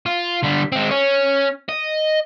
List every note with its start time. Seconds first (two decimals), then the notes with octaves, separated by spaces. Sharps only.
0.06 F4
0.43 D3 G3
0.72 G#3 C4
0.91 C#4
1.69 D#5